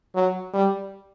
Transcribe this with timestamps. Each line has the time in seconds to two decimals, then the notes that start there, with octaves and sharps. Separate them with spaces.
0.15 F#3
0.53 G3